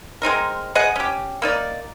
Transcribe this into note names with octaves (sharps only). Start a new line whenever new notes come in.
G#3 C4 D#4 A#4
G#4 D#5 F#5
C#4 G4
A#3 D#4 D5